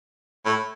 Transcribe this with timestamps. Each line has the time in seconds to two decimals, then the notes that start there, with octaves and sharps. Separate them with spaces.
0.45 A2